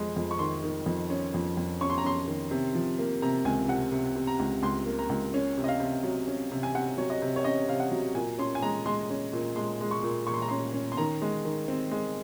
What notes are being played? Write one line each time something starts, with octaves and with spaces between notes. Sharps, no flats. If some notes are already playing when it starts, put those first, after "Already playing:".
Already playing: F2 G#3
F2
C#6
D#3 C6
D#3
F2
C#4
F2
F2
C#4 C#6
C6
A#5
C#4 C6
D#3
C3
F3
A#3
C3 A#5
C#2 G#5
C3 F#5
C3
C3
A#5
C#2
C#2 C6
A#3
A#5
C#2
C#4
C3
D#5
F5
C3
F#3
C#4
C3
G#5
C3 F#5
F#3 C#5
D#5
C3
C#5
C#4 D#5
C3 F5
F#5
F#3
A#2 G#5
C#4 C6
G#5
G#3 A#5
G#3 C6
C#4
A#2
G#3 C6
G#3
C#6
A#2
A#2 C#6
C6
A#5
C#4 C6
C#4
C6
D#3 A#5
G#3
D#3
C4
G#3